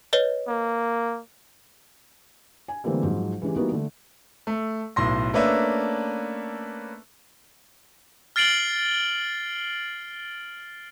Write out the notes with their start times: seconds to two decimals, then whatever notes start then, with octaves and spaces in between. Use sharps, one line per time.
0.13 B4 C#5 D#5
0.48 A#3
2.68 G#5
2.84 D3 E3 G3 A3 A#3 C4
3.03 G#2 F3 F#3
3.42 E3 G#3 C#4 G4
3.56 E3 G3 A#3 B3 D#4 F#4
3.72 D3 A3
4.47 A3
4.96 B1 A2 C6 A#6
5.33 A3 A#3 C#4 D4 B4 E5
8.36 F6 A6 C7 D7 F#7 G7